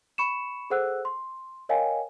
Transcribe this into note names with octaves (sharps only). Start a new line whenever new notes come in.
B5 C#6 C#7 E7
G#4 A4 C5 F#5 E6 F#6
C6
A#4 C#5 D#5 F5 G5 G#5